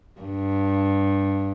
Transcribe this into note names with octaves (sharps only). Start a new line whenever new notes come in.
G2